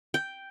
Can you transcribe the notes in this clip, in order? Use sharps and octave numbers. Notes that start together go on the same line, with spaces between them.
G5